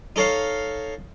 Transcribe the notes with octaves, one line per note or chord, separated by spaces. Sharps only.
D#4 A4 C#5 F5